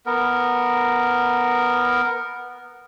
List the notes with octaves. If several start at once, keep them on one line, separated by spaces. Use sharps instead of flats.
B3 A#4